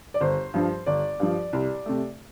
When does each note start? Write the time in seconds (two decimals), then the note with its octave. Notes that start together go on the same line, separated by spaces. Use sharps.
0.14 D5
0.21 G1 C5
0.54 G2 F3
0.86 G1 D5
1.20 G2 F3
1.53 C2
1.86 C3 A3